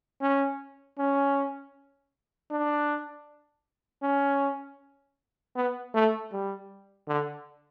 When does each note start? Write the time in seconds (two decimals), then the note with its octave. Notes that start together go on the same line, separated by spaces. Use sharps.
0.22 C#4
0.99 C#4
2.51 D4
4.03 C#4
5.56 B3
5.95 A3
6.32 G3
7.08 D3